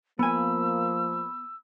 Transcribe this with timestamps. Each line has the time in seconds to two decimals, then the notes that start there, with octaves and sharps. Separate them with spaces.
0.19 F3 A#3 B3 G#5 B5 E6